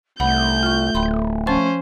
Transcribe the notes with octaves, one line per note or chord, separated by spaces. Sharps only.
C2 A3 F#5 B5 G6
F4 C#6
D1 G5 B5 C6
F3 C#4 C5 A5 C#6